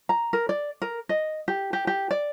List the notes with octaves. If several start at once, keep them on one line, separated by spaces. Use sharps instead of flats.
A#5
A#4
D5
A#4
D#5
G4
G4
G4
D5